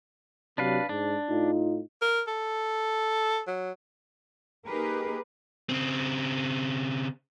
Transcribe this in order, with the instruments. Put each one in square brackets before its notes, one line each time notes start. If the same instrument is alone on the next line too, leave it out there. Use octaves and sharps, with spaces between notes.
[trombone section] C3 F#3 [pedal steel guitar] D4 B4 F5
[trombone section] G#2 [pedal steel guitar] D4
[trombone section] A2 D#4 F4
[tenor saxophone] A#4
A4
F#3
[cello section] A#3 D#4 G4 G#4 A#4 B4
[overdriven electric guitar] C#3 C4